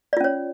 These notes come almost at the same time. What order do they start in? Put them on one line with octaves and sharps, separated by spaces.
D5 F4 C#4 C#5